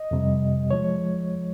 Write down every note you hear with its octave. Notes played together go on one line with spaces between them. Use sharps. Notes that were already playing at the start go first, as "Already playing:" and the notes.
Already playing: D#5
F2 C3 G3
F3 G#3 C#5